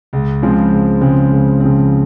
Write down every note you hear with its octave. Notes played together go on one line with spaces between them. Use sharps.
C#2
C#3 F3 G#3 C4
C#2
C#3 F3 G#3 C4
C#2
C#3 F3 G#3 C4